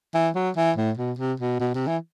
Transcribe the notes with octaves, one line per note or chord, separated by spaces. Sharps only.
E3
F#3
E3
A2
B2
C3
B2
B2
C3
E3